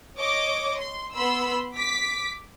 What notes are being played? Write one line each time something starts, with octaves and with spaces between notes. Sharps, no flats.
C#5 D#5 D6
C6
B3 B5 C6 E6
D6 B6